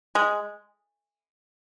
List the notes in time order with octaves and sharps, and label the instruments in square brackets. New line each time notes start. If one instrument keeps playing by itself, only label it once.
[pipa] G#3